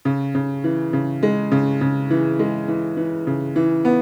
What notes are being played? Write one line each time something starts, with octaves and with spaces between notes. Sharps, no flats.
C#3
C#3
E3
C#3
G#3
C#3
C#3
E3
G#3
E3
E3
C#3
E3
B3